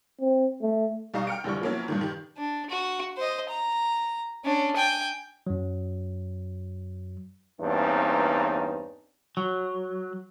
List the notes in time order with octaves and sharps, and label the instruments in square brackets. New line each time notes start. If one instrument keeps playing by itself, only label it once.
[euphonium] C4
A3
[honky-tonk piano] B1 G3 D#4 F5 A#5 C#6
G5 F6 C#7 D7
F1 D3 G3 E4 C#6
F3 F#3 A#3 B3 C#4 E4
G2 A#2 D#3
D#3 G4
[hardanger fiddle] D4
F#4
C5 D#5
A#5
C#4 D4
G5 G#5
[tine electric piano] F#2 F#3
[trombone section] E2 G2 A#3 C4 C#4 D#4
[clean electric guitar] F#3